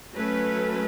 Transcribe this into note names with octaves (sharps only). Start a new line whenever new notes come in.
F#3 A3 C#4 B4